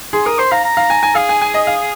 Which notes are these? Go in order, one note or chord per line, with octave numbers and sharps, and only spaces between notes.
G#4 C6
A#4 D#6
C5 C6
F5 A#5
A#5
F5
G#5
G#5
G#4 F5
G#5
G#5
D#5
F5